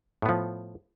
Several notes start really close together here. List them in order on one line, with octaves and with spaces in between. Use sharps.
A2 B3 F3